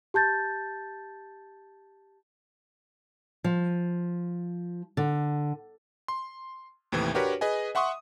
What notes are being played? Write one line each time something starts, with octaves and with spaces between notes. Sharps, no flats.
G4 A5 G6 A6
F3
D3
C6
D#2 A2 C3 E3
D4 F#4 G4 A#4 B4 C#5
G#4 B4 D#5 G#5
E5 F#5 C6 C#6 D#6